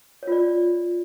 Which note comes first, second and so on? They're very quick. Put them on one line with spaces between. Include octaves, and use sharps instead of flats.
C#5 F4 D5